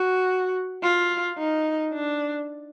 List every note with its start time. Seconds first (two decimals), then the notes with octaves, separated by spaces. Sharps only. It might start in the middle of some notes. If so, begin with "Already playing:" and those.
Already playing: F#4
0.82 F4
1.38 D#4
1.93 D4